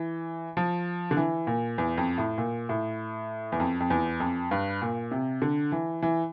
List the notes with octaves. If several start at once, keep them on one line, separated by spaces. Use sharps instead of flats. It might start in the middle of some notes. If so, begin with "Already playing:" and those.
Already playing: E3
F3
D3
E3
A#2
E2
F2
A2
A#2
A2
E2
F2
F2
E2
F2
G2
A#2
C3
D3
E3
E3